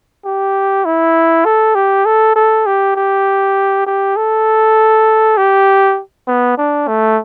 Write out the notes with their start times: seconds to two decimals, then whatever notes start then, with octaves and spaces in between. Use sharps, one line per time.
0.25 G4
0.85 E4
1.45 A4
1.75 G4
2.06 A4
2.36 A4
2.66 G4
2.96 G4
3.86 G4
4.16 A4
5.37 G4
6.28 B3
6.57 D4
6.88 A3